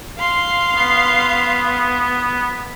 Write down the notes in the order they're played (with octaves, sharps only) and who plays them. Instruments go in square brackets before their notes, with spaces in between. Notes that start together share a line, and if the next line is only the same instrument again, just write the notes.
[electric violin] F5 C6
[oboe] B3